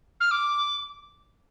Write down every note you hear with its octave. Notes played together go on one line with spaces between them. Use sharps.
F6
D6